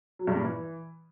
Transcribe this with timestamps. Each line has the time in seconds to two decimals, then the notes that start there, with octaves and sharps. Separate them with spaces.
0.19 F#3
0.27 G2
0.36 A#2
0.44 E3